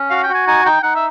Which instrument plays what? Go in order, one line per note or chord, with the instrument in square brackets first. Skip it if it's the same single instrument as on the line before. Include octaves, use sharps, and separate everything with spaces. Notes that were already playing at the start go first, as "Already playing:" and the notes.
Already playing: [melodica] C#4
[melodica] F#4 [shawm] F5
[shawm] G5
[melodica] F#4
[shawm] G#5
[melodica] D#4 [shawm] G#5
[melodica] D#4 [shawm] G5
[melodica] D#4 [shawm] F#5
[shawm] E5